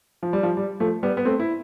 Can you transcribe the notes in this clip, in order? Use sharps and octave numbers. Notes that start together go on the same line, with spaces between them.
F3
G3
F3
G3
F3 A3
G3 B3
B3
A3 C4
E4